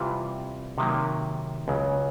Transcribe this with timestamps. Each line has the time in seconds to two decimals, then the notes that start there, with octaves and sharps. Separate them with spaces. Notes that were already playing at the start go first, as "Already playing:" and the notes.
Already playing: C3 E3 G3 C4 F4
0.78 C3 D#3 F#3 A#3
1.68 C#2 C#3 F#3